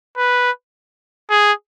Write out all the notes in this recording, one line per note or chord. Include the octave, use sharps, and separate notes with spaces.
B4
G#4